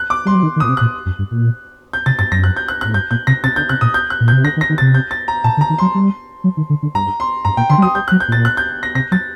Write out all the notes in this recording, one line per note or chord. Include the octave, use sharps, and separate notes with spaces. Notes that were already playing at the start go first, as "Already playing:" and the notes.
Already playing: F#6
D6
G3 C6
F#3
D#3
D#3
A#2 D#6
C3
A#2 F#6
F#2
G2
A#2
G6
C3 A6
G2 A6
F#2 A#6
F#6
G6
F#6
A2 F#6
G2 G6
A#2 G6
C3 A#6
C3 A6
D3 G6
C3 F#6
A#2 D#6
G6
F#6
A#2
C3 G6
D3 A#6
D#3
A#6
D#3
C3 A6
G6
A6
A#5
A#2 A5
D3
A#5
D#3
F#3 C6
G3
F#3
D#3
D3
D3
G2 A#5
C6
G2 A#5
A#2 G5
D3 C6
G3
F#3 D#6
G3 G6
F#6
F#3
G6
A#2 A6
F#6
G6
A#6
C3 A#6
F#3 A6